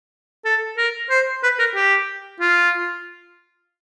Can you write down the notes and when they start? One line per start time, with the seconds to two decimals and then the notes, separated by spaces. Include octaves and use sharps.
0.45 A4
0.77 A#4
1.10 C5
1.43 B4
1.59 A#4
1.75 G4
2.40 F4